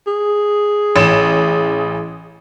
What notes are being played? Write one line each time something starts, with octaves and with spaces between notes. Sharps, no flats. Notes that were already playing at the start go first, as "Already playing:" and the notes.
G#4
A1 E7